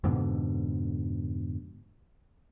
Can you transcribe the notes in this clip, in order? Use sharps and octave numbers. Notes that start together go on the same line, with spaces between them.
F2 G#2 B2 D3